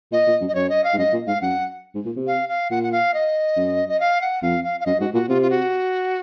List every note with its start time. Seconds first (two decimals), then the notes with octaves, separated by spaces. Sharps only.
0.12 A#2 D#5
0.27 A#2
0.41 F#2
0.48 D#5
0.55 F#2 C#5
0.69 D#5
0.84 F5
0.94 G#2
0.98 F#2 D#5
1.13 A#2
1.27 G#2 F5
1.41 F#2 F#5
1.95 G#2
2.05 A#2
2.16 C3
2.27 F5
2.49 F5
2.70 A#2 F#5
2.83 F#5
2.92 F5
3.14 D#5
3.56 F#2
3.89 D#5
4.00 F5
4.21 F#5
4.42 F2 F5
4.64 F5
4.80 F5
4.86 F#2 D#5
5.00 G#2 F#4
5.14 A#2 F#4
5.29 C3 F4
5.42 F4
5.50 F#4